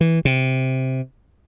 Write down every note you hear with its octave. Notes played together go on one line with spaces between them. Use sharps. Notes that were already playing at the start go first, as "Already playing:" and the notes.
E3
C3